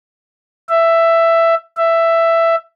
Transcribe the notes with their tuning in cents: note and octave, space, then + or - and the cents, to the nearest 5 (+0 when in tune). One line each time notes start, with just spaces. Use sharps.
E5 +10
E5 +10